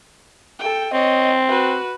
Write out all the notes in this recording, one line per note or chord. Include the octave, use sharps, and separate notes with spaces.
A4 G5
C4 C#5 D#5
F#4 B4